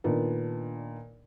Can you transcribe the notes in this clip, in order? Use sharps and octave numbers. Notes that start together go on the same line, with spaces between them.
A#2 D#3 B3 D4